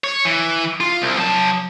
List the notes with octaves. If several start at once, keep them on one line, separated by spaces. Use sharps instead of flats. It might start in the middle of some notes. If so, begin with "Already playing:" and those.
C#5
E3
F4
C2
F#3 A5